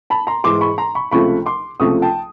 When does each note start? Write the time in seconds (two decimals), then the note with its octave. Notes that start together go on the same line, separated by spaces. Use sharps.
0.10 A5 B5
0.27 A#5 C6
0.44 G#2 E3 G#3 C6 D6
0.61 B5 C#6
0.78 A#5 C6
0.95 B5 C#6
1.11 C#2 C3 F3 A3 B5 C#6
1.46 C6 D6
1.80 C#2 C3 F3 A3 C#6 D#6
2.02 G5 A5